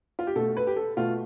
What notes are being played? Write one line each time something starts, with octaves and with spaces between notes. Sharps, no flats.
F4
G4
B2 A3 A4
B4
G4
A4
B2 A3 F4